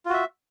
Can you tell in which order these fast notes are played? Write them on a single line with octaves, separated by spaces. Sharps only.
F4 F#4 E5